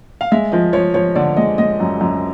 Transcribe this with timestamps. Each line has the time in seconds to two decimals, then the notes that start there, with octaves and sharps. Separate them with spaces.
0.21 F5
0.32 G#3 E5
0.52 F3 D#5
0.73 F3 C#5
0.94 F3 C#5
1.15 D3 D5
1.37 G#3 D#5
1.58 G#3 D#5
1.80 F#2
2.01 F#2